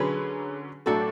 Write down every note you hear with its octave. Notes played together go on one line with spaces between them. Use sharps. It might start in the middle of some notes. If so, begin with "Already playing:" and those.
Already playing: D3 F#3 C#4 G#4 B4
A2 F#3 A3 D4 F#4 A4